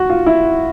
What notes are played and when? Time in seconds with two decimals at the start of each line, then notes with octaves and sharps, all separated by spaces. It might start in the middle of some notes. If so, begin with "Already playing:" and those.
Already playing: F#4
0.10 F4
0.26 E4